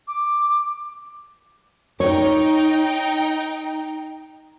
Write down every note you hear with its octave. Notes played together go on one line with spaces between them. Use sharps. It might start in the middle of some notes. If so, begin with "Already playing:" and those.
D6
D#4 C#5 G5 A#5